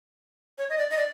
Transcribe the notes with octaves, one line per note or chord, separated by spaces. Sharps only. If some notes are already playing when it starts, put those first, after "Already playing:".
C#5
D#5
D5
D#5
D5